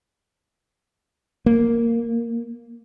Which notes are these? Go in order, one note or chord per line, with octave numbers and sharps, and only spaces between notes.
A#3